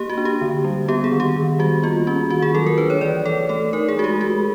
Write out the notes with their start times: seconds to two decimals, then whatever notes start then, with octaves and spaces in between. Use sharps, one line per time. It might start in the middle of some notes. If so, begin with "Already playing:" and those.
Already playing: A#3 G4
0.09 F#4
0.17 D4
0.25 G4
0.41 D3
0.64 G3
0.88 B3 G4
1.04 G#4
1.12 D#3
1.20 G4
1.36 D#3
1.59 G3 F#4
1.83 A#3 F4
2.07 C#4 F#4
2.30 D#3 F#4
2.42 G#4
2.55 F#3 A4
2.66 A#4
2.78 D4 B4
2.90 C#5
3.01 E3 D5
3.26 E3 A4
3.49 A3 A4
3.73 D#4 A#4
3.88 G#4
3.97 G#3 F#4
4.04 G4
4.21 G#3 F#4